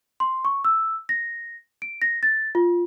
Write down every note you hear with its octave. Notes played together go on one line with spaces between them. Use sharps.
C6
C#6
E6
A#6
D7
A#6
A6
F4